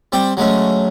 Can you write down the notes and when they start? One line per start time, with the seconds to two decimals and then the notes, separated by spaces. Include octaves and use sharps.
0.12 G3 C4 D5 G5
0.37 F#3 G#3 A3 C#4